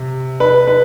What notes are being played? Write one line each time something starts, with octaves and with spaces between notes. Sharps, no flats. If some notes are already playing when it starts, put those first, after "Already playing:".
Already playing: C3
B4
B4